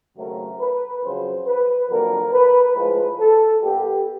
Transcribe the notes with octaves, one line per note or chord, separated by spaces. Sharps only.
D#2 C#3 F#3 A3 C4 A#4
B4
F2 C#3 F#3 C5
B4
F2 D3 F#3 A#3 A#4
B4
A2 F3 G#3 B4
A4
A#2 G3 B3 G4